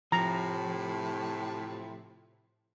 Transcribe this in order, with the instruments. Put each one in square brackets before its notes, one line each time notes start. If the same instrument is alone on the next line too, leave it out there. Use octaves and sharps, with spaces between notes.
[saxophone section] A2 C3 [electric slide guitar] F3 [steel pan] A#5